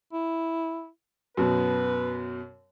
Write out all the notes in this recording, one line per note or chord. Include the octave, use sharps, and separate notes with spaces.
E4
F#2 B2 B4